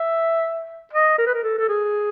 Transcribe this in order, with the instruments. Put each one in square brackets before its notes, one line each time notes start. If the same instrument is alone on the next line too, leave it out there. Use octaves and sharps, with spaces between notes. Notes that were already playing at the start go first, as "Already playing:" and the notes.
Already playing: [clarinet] E5
D#5
A#4
B4
A#4
A4
A4
G#4